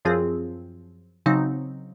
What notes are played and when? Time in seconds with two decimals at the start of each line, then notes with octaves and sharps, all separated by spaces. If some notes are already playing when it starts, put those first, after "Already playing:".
0.05 F#2 F3 C4 F4 G#4
1.26 C#3 F#3 C4 D#4